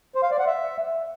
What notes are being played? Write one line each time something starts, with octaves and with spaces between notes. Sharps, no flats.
C5
F5
D5
F#5
E5